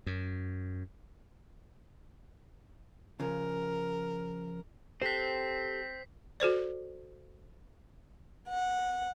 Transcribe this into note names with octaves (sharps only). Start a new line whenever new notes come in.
F#2
C#3 F3 A#4
C4 G4 A4 C5 F#6 B6 C7
F#4 A4 C5 D5
F#5